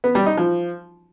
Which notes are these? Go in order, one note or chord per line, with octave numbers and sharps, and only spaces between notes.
B3
G3
D#4
F3